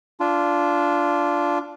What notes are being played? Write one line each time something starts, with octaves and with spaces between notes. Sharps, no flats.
D4 F4